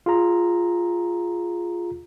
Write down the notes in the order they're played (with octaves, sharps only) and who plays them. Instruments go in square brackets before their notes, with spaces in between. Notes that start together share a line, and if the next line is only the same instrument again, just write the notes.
[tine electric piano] F4 G#4 A#5